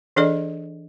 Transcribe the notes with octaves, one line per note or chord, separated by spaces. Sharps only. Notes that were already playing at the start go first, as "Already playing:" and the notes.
E3 D4 G#4 A4 D5 D#5